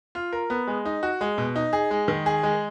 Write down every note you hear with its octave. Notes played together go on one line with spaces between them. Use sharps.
F4
A#4
B3
G#3
D#4
F#4
G#3
B2
D#4
G#4
G#3
D#3
G#4
G#3